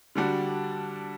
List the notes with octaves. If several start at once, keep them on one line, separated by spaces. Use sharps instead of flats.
D3 G3 D4 F#4